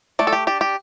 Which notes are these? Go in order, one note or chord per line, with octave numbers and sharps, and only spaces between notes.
A3 D5
A4
G4
D4 G4
G4